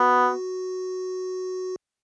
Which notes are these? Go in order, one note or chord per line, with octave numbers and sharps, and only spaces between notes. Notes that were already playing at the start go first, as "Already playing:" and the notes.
Already playing: B3 F#4